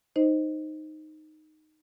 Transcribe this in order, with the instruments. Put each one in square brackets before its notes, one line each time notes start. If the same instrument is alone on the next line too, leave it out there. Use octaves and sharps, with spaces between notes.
[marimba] D#4 C5 D#5